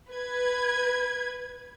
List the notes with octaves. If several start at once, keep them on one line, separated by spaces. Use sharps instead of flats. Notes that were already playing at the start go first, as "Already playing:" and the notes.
B4 G#6